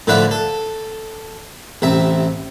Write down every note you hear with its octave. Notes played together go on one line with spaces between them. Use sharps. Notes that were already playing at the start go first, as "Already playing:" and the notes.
A2 D3 F3 B4 D5 E5
A4
A1 C3 E5